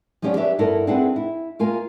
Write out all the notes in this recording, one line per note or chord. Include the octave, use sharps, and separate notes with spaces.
F3 F#3 C#4 G4 D5
D4 G4 B4 C#5 E5
G2 B3 E4 A4 A#4
C4 D4 E4 G#4 B4 F#5
E4
A#3 F4 A#4 G#5